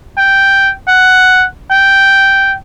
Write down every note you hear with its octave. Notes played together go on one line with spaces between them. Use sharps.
G5
F#5
G5